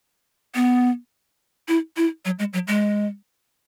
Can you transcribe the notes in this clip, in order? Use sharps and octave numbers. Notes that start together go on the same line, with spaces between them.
B3
E4
E4
F#3
G#3
F#3
G#3